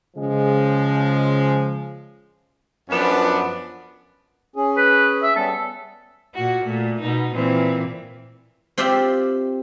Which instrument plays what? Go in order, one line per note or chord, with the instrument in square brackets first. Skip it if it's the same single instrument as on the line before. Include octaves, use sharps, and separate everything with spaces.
[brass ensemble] C#3 F3 G#3
[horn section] F#2 F3 B3 D4
[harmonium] C#4 G#4
[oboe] B4
E5
[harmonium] G3 B3 C#4 [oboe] A4
[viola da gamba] A#2 F#4
A#2 A3
B2 D#4
A#2 E3 C4
[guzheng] C4 F4 G4 C5 D5 E5